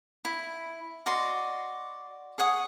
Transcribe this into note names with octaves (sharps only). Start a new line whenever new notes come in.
E4
F#4 D5 D#5 C6
G#4 C#5 F#5 D#6